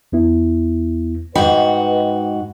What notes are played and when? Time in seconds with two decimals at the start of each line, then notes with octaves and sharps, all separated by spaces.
0.12 E2 B3 E4
1.35 G#2 F#4 B4 D#5 G5 B5